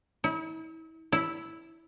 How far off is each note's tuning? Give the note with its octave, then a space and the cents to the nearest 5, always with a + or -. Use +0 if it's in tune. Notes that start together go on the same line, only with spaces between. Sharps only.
E4 -40
E4 -5